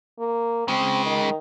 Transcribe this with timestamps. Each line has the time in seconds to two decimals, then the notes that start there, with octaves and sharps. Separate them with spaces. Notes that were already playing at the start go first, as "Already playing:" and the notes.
0.19 A#3
0.68 C#3 G#3 C4
1.06 D#3